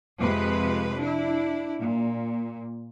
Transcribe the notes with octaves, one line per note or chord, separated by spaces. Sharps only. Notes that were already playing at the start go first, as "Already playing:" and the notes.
F2 C3 G#3 B4
D4 E4
A#2